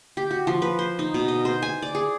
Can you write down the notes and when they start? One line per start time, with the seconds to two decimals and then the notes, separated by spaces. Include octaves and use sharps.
0.17 G4
0.31 F#4
0.47 F3
0.62 B4
0.79 C5
0.99 D#4
1.14 B2
1.28 D#5
1.45 C5
1.62 G#5
1.82 D5
1.95 G#4